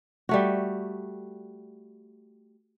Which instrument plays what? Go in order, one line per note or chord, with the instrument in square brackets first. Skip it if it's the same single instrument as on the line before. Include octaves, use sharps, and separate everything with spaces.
[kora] G3 A3 F#4